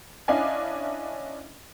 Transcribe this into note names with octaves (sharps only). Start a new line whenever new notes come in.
C#4 D4 E4 D#5 F5 G#5